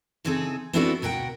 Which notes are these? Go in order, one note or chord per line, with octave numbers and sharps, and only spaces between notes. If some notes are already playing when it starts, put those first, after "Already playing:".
C#3 E3 C4 D#4 G#4 A4
B3 C4 D4 E4 F#4 A4
D2 B2 A#4 F#5 G5